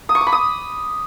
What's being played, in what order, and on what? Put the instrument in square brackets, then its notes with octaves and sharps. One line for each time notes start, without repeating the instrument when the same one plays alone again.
[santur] D#6
C#6
D6
B5
D#6